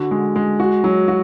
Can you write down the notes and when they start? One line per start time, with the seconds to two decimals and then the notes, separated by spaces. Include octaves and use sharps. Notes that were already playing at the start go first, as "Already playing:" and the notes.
Already playing: D3 F#4
0.11 G#3
0.36 G#3
0.60 F#4
0.84 F#3
1.08 F#4